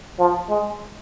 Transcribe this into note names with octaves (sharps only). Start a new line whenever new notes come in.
F3
G#3